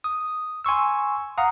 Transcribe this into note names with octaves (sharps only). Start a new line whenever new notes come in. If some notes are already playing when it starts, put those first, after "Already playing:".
D#6
G#5 C6 C#6 E6
F5 F#5 A#5 D#6